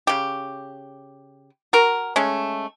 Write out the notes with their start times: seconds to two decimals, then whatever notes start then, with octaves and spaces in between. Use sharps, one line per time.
0.07 C#3 G4
1.73 F#4 A#4
2.16 G#3 A3 C#4